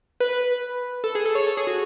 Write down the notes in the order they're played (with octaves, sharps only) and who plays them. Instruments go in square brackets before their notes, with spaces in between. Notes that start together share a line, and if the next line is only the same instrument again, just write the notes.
[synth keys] B4
A4
G#4
A4
C#5
A4
G#4
F#4